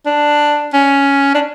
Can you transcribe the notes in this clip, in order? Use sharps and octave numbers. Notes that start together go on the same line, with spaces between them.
D4
C#4
D4